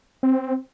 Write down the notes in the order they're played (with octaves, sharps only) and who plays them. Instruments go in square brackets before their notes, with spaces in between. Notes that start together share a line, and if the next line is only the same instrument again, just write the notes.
[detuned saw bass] C4